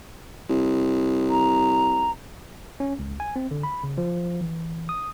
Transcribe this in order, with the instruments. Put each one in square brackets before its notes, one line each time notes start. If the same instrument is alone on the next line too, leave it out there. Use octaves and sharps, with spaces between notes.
[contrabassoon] C2
[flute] A#5
[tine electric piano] C#4
C#2
G#5
C4
D3
B5
C#3
F3
E3
D#6